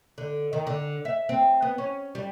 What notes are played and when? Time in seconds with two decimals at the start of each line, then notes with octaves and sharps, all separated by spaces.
0.18 D3
0.53 D#3
0.67 D3
1.05 E5
1.29 C4
1.62 B3
1.78 C#4
2.15 G3